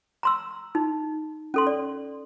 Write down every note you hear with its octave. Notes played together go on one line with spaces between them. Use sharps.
A#5 C6 E6
D#4
C#4 A4 C6
D5